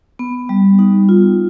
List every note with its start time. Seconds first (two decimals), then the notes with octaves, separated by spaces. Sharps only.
0.19 B3
0.49 G3
0.79 D#4
1.09 F4